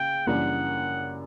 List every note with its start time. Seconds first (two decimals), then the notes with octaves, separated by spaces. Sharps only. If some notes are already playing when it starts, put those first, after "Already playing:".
Already playing: C#3 G5
0.27 F#1 F#2 E3 G3 D4 F#5